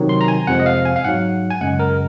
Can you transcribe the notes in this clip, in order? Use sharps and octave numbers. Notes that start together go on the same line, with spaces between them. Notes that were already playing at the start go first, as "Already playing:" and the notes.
Already playing: C3 D#3 F#3
C6
A#5
G#5
F2 C3 F3 G#3 F#5
D#5
F5
G#5
F5
G#2 F#3 F#5
G#5
F#2 C#3 G#3 F#5
A#4